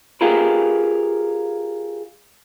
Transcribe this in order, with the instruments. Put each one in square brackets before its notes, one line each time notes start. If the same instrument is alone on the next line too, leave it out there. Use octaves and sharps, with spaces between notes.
[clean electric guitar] F4 G4 G#4 A#4 B4